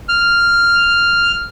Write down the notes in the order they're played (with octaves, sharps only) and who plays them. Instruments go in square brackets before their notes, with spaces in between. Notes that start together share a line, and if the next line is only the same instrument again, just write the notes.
[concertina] F6